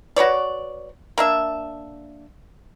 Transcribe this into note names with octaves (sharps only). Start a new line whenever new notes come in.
F#4 B4 C#5 D5
A#3 D4 E5